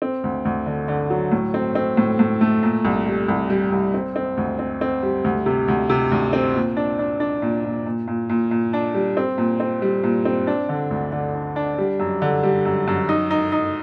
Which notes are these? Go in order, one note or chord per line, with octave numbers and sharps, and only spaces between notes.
C4
D2
D2
D3
D3
F#3
A2
C4
C4
A2
A2
A3
A#2
C2
G3
C2
G3
C2
C4
C4
D2
C4
C4
G3
D2
C3
D2
C3
D2
C4
A#2
D4
D4
D4
A#2
A#2
A#2
A#2
A#2
A#2
D4
G3
C4
A#2
C4
G3
A#2
C4
D4
D3
D2
D3
D4
D4
G3
F#2
D3
G3
F#2
F#2
D#4
D#4
D#4